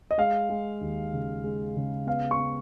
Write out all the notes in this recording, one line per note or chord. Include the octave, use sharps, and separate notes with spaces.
D#5
G#3 F5
G#3
D#2
C#3
G#3
C#3
B3 F5
C#6
B3